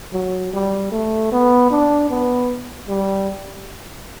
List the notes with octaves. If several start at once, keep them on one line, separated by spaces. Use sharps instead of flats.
F#3
G3
A3
B3
D4
B3
G3